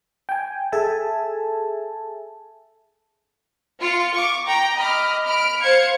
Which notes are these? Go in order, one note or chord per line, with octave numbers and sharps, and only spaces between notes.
G5 G#5
G#4 A4 E5 G#5 A5
F4 C#7
C#6 D6
G5 A#5
D#5 B5 D6 F6
B5 F6 D7
C5 F5 G#6 C#7